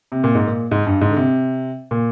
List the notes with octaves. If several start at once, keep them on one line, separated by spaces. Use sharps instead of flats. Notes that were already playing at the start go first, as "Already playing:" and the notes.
C3
A#2
G#2
A#2
G#2
G2
G#2
D3
C3
A#2